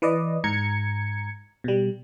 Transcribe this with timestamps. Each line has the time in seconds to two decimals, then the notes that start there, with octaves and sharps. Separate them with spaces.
0.02 E3 B4 D5 D#5
0.44 G#2 A#5 G#6 C#7
1.64 B2 G3